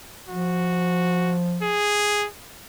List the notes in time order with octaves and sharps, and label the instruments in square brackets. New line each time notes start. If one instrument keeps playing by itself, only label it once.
[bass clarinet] F3 [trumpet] F#4
[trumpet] G#4